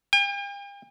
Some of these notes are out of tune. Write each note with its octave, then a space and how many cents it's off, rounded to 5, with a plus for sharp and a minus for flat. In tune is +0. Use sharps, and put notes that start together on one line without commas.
G5 +45